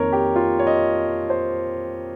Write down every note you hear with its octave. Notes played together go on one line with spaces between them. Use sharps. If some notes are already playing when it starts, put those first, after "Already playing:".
Already playing: F2 D#3 A#3 A#4 C#5
G4
F4
C#5
D#5
C5